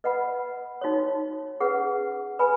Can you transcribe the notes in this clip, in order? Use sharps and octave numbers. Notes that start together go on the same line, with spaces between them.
B4 D#5 F#5 B5
D#4 F#4 C#5
C#4 G#4 B4 F#5
B4 G#5 B5